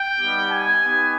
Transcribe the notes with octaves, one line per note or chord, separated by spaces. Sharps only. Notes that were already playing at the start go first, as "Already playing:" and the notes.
Already playing: G5
G3 B3 D#4 G4
G#5
B3 D#4 G4